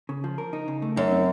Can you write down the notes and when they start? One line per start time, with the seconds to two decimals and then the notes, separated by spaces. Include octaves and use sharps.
0.09 C#3
0.24 F3
0.38 A#4
0.53 D#4
0.68 C#3
0.82 A3
0.96 F#2 D#4
1.11 C4